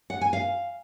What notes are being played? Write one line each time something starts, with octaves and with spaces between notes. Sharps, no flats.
F#5
G#5
F5